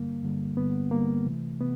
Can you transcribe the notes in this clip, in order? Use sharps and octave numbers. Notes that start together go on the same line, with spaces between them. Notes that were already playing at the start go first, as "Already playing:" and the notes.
Already playing: G2 D3 G3 A#3
G2 D3 G3
G2 D3 G3 B3
G2 D3 G3 A#3
C3 E3 A3
C3 B3